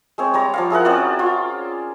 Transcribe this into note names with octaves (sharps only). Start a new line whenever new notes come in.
G#3 C4 C#5
G3 C#5 A#5
F3 D5 F5
E4 G#4 A#4 F#5
C4 C#4 F#4 D5
F4